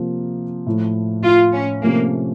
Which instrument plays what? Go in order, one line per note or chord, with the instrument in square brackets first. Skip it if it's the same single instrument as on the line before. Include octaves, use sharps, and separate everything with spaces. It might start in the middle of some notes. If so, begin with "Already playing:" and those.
Already playing: [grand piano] C3 F3 A#3 F4
A2 F3 A3
[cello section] F4
C#4
[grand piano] C3 F3 A3 C#4 [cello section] A#3